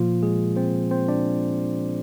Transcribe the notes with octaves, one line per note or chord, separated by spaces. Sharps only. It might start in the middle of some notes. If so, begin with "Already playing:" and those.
Already playing: A#2 F3 A#3 F4
G#3 G#4
C4 C5
C4 C5
D4 D5